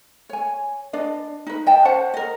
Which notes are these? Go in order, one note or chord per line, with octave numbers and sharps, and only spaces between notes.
C#5 G#5
D4 B4 D5 D#5
D#4 B4
D#5 G5 A5
C#4 C5 F#5 A5
A#4 D#5